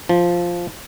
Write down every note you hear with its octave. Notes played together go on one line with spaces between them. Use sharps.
F3